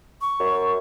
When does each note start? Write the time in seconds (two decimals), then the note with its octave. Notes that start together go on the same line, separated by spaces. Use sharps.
0.21 C#6
0.40 F#2